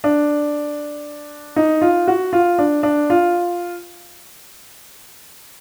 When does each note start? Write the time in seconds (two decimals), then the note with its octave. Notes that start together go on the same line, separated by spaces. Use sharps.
0.04 D4
1.56 D#4
1.82 F4
2.08 F#4
2.33 F4
2.59 D4
2.83 D4
3.10 F4